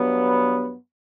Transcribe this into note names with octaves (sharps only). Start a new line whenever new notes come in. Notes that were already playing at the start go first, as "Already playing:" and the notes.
Already playing: G2 F#3 B3